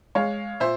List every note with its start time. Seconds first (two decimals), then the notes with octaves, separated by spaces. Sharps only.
0.15 G#3 C#5 F5
0.60 A#2 C5 E5